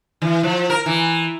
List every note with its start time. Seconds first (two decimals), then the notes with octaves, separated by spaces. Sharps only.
0.22 E3
0.43 F3
0.70 A#4
0.86 E3